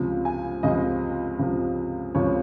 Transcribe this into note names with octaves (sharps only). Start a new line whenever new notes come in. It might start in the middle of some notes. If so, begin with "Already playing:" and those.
Already playing: C#2 C3 F3
G#5
C#2 C3 F3 D#5
C#2 C3 F3
C#2 C3 F3 C#5